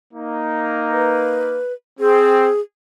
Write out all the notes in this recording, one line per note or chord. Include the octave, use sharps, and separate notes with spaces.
A#3 D#4
B4
C4 G#4